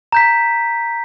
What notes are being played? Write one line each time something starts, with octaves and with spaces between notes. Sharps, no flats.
A#5 G6 B6